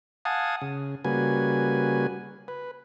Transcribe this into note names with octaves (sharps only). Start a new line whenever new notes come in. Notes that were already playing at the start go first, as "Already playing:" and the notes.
F5 F#5 G#5 A5 D#6
C#3
C#3 G3 A#3 F#4 B4 G#5
B4